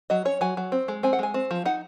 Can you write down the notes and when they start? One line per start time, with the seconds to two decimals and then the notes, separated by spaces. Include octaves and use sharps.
0.10 F#3 D#5
0.25 C#4 C#5
0.41 F#3 G#5
0.57 F#3
0.72 C4
0.88 G#3
1.03 C4 G#5
1.13 F#5
1.19 G#3 G#5
1.34 C4
1.51 F3
1.65 D#4 F#5